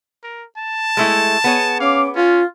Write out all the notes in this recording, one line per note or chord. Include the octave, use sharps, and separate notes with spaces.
A#4
A5
G#3 A3 E4
B3 G#4 C#5
C#4 F5 D6
C#4 F4